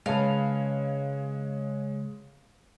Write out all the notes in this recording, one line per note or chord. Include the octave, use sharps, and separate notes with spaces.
C#3 G#3 B4 C#5 F5 A5